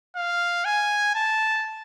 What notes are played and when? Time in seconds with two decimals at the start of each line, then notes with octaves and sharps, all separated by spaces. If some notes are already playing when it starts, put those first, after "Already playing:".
0.16 F5
0.65 G#5
1.15 A5